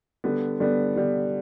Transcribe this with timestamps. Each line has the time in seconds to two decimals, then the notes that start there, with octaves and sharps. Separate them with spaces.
0.24 D3 G3 B3
0.60 D3 G3 B3
0.96 D3 G3 B3